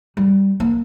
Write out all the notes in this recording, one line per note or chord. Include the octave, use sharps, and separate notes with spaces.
G3
A#3